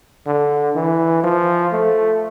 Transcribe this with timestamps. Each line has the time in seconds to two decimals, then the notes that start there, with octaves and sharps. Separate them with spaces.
0.27 D3
0.76 E3
1.24 F3
1.72 A3